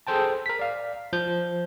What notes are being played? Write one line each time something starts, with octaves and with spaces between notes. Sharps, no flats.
G#4 A4 C5 G5 A5
A#4 B6
D5 F5
F3 G6